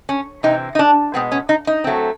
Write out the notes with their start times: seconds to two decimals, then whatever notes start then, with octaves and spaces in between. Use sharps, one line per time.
0.09 C#4
0.43 C3 E3 C4 D#4
0.75 D#4
0.79 D4
1.14 B2 G#3 B3 C4
1.32 C#4
1.49 D#4
1.67 D#4
1.84 A2 F#3 A3 C4